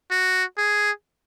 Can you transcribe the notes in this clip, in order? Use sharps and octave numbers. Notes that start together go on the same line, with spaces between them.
F#4
G#4